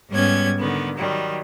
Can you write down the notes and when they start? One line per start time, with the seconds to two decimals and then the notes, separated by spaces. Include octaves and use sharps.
0.11 G#2 G3 B3 C#4 G#6
0.61 D3 D#3 B3
0.97 D#3 F#3 G3